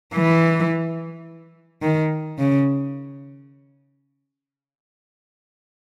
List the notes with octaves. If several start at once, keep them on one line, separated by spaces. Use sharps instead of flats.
E3
D#3
C#3